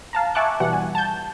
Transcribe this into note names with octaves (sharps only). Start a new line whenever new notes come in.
F5 A5 A#5
E5 G#5 A5 C#6 D6 F#6
B2 E3 G3 F#5
G#5
A5 G6